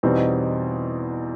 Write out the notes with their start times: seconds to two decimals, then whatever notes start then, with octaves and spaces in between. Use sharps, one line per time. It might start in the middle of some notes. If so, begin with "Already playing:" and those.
0.03 E2 B2 G3 C4 D#4